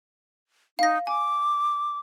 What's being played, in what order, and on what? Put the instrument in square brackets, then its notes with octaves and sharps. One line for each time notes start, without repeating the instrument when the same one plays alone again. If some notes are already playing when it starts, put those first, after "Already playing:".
[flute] D#4 [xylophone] F5 A#6
[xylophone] G#5 [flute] D6